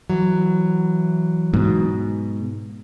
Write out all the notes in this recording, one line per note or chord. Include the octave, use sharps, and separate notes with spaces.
E3 F#3
G#2 B2